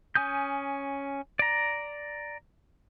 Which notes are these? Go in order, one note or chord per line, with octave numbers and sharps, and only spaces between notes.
C#4 G#5 D#6 G6
D5 A#5